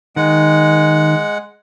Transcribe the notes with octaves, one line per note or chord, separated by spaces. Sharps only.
D#3 G#3 F#5